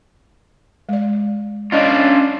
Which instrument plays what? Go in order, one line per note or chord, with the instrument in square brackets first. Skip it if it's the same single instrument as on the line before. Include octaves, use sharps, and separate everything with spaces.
[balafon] G#3 D5
[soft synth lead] C#4 [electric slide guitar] D4 F4 [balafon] D#5